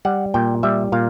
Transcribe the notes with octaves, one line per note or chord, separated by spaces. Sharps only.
G3 F#5
A#2 G5
G3 E5
A#2 F5